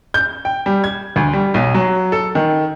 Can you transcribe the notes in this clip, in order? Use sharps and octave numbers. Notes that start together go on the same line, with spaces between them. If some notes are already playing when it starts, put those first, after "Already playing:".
G6
G5
G3
G#6
D2
G3
B1
F#3
A4
D#3